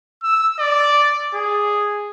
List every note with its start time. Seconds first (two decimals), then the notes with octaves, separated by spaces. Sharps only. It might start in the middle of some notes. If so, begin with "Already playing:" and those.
0.23 E6
0.59 D5
1.35 G#4